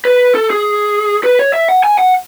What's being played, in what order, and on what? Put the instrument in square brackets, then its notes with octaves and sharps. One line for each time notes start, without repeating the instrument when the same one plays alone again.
[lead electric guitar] B4
A4
G#4
B4
C#5
E5
F#5
G#5
F#5